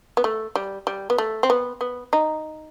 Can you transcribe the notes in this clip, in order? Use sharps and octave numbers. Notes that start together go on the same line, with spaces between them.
B3
A3
G3
G3
B3
A3
C4
B3
B3
D#4